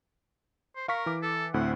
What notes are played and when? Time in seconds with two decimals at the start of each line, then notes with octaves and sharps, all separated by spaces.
0.76 C5
0.88 A#4 F5 C#6 B6
1.06 E3 D6
1.22 A4
1.54 D2 A2 C4 F#5